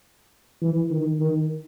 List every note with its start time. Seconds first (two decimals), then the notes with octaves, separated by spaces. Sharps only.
0.62 E3
0.91 D#3
1.20 D#3